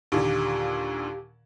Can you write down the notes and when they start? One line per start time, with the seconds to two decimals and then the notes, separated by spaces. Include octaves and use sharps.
0.12 D#2 A#2 D3 G4